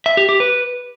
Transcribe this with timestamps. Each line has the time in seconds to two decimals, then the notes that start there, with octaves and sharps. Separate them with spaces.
0.06 E5
0.17 G4
0.29 G4
0.40 B4